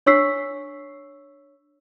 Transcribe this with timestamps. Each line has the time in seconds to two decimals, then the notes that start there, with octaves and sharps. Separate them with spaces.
0.06 D4 C#5 C#6 E6 B6 C7